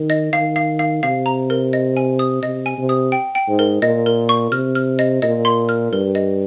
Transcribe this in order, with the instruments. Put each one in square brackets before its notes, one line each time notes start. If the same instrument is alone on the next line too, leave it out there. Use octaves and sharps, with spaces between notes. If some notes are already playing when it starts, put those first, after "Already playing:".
Already playing: [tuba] D#3
[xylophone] D#5
[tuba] D#3 [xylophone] F5
[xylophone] F5
F5
[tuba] C3 [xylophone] F5
[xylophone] A#5
A#4
D#5
G#5
D#6
[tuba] C3 [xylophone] D#5
[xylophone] G#5
[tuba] C3
[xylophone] D#6
G5
G5
[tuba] G#2
[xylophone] A#4
[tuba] A#2 [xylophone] D#5
[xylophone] A#4
C#6
[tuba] C3 [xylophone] F6
[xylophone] F6
D#5
[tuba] A#2 [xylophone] D#5
[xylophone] C6
F6
[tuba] G2 [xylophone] A#4
[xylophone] D#5